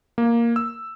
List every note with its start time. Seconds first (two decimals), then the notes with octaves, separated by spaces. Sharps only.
0.18 A#3
0.56 E6